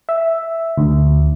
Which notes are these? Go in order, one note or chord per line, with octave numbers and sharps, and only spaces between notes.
E5
D2